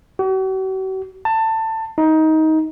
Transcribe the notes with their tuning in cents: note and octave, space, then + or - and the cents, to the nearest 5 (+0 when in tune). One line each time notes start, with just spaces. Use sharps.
F#4 +45
A5 +20
D#4 +20